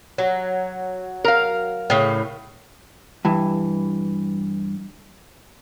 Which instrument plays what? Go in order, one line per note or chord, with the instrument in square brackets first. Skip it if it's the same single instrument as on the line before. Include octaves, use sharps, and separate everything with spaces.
[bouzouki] F#3
[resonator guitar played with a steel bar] A#4 F5
[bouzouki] A2 C#3
[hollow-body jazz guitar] G2 E3